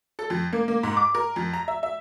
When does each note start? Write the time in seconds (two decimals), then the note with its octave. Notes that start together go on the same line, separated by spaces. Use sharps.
0.19 A4
0.30 F2
0.53 A#3
0.68 A#3
0.83 G#2
0.97 D6
1.15 A#4
1.36 F2
1.53 A#5
1.68 E5
1.83 E5